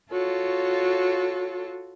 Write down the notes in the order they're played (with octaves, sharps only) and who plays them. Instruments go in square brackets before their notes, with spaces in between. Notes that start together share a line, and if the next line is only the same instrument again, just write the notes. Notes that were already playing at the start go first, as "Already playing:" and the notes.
[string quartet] F4 F#4 A4 C#5